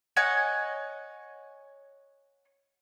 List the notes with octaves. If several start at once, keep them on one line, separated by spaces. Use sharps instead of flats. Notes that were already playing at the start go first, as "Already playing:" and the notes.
C#5 D#5 F#5 G#5